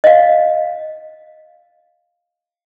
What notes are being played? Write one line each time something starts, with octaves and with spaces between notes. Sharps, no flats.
D#5 F5